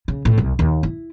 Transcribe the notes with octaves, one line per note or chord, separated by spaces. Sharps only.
C#3
A2
C2
D#2
E4